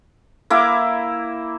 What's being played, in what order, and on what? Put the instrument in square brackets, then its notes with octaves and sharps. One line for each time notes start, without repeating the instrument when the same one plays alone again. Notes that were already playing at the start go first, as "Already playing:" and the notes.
[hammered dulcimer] A#3 E4 D6